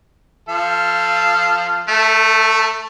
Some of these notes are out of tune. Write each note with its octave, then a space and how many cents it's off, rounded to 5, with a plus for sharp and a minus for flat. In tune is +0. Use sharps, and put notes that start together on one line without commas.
F3 +0 A4 +0 F5 -15
A3 +0 A4 +40